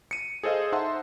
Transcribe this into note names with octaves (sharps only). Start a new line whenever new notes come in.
C#7 D#7
G#4 A4 C5 D#5 F5
D#4 C5 E5 F#5 A5 C6